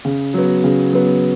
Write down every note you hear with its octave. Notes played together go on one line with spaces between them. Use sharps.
C#3
F#3 B3
C#3
F#3 B3